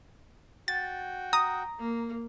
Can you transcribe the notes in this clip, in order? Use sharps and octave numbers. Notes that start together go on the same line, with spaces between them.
F#4 G5 A6
A#5 D#6
A#3